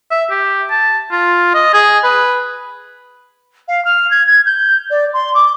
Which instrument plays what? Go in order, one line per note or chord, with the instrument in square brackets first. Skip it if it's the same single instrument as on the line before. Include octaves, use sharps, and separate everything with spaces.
[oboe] E5
G4
A5
F4
D#5
G#4
B4
[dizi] F5
F6
G#6
G#6
G6
D5
C6
D6